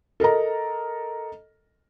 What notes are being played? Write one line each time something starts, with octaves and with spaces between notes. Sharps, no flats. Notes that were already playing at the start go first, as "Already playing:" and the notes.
A4 A#4 D#5 A#5